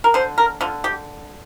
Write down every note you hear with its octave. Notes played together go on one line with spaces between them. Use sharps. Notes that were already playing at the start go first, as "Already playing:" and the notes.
A#4
D3 C5
A#4
D3 F4
G4